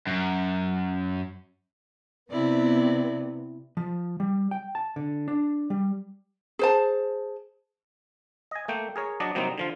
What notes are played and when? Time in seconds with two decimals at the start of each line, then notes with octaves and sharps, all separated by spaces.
0.07 F#2
2.31 C3 B3 E4 D5
3.77 F3
4.20 G3
4.51 G5
4.75 A5
4.96 D3
5.28 D4
5.70 G3
6.59 G#4 C5 A5
8.51 D#5 G#5
8.68 A3 A#3 G5
8.96 G#4 A#4 C#5
9.20 F#3 D4 D5 D#5
9.35 C3 F#3 G3 A#3 C4 D#4
9.58 D3 F3 F4